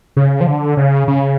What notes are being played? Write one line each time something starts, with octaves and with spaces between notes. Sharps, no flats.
C#3
F3
D3
C#3
C#3